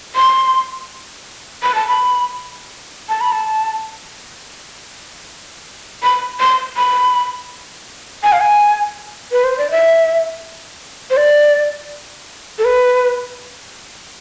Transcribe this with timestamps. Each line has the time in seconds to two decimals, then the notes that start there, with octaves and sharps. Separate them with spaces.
0.16 C6
1.63 B5
1.75 A5
1.87 B5
3.09 A5
3.21 B5
3.32 A5
6.03 B5
6.40 C6
6.77 B5
8.23 G#5
8.32 F5
8.41 G#5
9.32 B4
9.44 C5
9.58 D5
9.71 E5
11.10 C5
11.17 D5
12.59 A4
12.65 B4